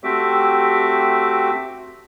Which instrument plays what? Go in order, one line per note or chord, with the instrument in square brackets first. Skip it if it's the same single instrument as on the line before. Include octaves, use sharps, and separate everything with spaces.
[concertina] A3 C4 F#4 G4 E5 D6